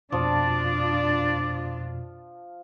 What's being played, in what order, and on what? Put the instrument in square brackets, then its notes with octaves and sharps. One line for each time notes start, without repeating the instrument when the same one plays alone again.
[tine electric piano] F2 B2 [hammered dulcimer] F3 [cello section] D4 F4 [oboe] D5